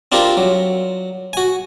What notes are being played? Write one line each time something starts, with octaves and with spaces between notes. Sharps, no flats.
C4 D4 F4 G4 A#4
F#3
F#4 G#5